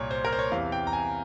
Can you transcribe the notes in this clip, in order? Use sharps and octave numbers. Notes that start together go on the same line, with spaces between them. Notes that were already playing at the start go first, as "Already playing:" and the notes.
Already playing: C2 A#2 C#5
C5
A#4
C5
C#5
E2 C3 E3 F5
G5
A#5
G#5